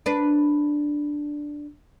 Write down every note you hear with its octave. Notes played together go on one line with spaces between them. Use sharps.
D4 B4